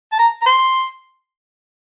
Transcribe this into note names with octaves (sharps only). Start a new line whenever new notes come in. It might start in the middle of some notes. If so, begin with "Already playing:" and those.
A5
A#5
A#5
C6